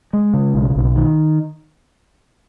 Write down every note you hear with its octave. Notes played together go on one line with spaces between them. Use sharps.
G#3
C#3
B1
B1
D#3